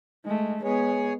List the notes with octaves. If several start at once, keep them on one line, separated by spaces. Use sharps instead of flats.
G#3 A3
G#3 B3 G#4 C#5